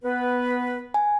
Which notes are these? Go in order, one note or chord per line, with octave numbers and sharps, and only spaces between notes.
B3 B4
G#5